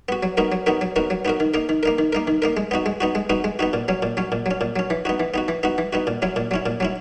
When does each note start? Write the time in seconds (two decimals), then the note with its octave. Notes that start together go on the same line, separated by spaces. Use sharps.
0.09 B3 F#4
0.23 F#3
0.37 B3 D#4 F#4 A#4
0.52 F#3
0.66 B3 D#4 F#4 A#4
0.81 F#3
0.96 B3 D#4 F#4 A#4
1.10 F#3
1.25 B3 D#4 F#4 A#4
1.40 D#3
1.54 A#3 D#4 A#4
1.69 D#3
1.83 A#3 D#4 A#4
1.99 D#3
2.13 A#3 D#4 A#4
2.27 D#3
2.42 A#3 D#4 A#4
2.57 G#3
2.71 B3 D#4 F#4
2.86 G#3
3.01 B3 D#4 F#4
3.15 G#3
3.30 B3 D#4 F#4
3.44 G#3
3.59 B3 D#4 F#4
3.73 A#2
3.88 F#3 C#4
4.03 A#2
4.17 F#3 C#4
4.32 A#2
4.46 F#3 C#4
4.61 A#2
4.76 F#3 C#4
4.90 E3
5.05 B3 D#4 F#4
5.20 E3
5.34 B3 D#4 F#4
5.48 E3
5.63 B3 D#4 F#4
5.78 E3
5.93 B3 D#4 F#4
6.07 A#2
6.22 F#3 C#4 E4
6.36 A#2
6.51 F#3 C#4 E4
6.66 A#2
6.80 F#3 C#4 E4